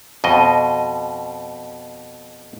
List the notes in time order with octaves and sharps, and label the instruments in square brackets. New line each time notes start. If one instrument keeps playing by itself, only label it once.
[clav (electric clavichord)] F2 B2 D#5